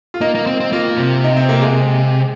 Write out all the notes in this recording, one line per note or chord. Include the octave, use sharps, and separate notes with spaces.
F4
A#3 D#4
A#3
C4
C4
A#3 F4
C3
D#4
C4
A#3
G#3